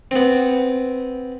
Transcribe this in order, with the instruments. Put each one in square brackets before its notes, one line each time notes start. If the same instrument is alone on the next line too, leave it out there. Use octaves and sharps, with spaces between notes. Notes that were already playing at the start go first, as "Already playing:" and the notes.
[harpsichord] B3 C4